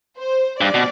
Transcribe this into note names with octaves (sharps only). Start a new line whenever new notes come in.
C5
G2 D5
B2